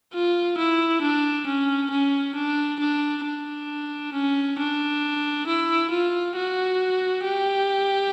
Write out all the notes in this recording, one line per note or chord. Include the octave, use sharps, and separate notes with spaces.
F4
E4
D4
C#4
C#4
D4
D4
D4
C#4
D4
E4
F4
F#4
G4